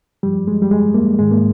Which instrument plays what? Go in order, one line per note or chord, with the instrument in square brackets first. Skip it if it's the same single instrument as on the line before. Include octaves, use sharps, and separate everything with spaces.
[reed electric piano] G2 F3 G3
G#3
G3
G#3
A#3
G#2 D#3 G#3
A#3